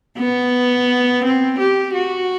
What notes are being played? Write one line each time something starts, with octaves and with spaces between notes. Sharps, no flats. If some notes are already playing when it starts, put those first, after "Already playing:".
B3
C4
G4
F#4